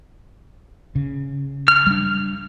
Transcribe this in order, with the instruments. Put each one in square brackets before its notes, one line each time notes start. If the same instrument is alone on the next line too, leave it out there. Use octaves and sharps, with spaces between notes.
[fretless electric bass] C#3
[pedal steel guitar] F6
[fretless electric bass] G3 D4